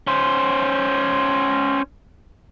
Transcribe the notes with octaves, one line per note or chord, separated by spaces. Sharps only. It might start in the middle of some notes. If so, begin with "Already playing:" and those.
C#4 C5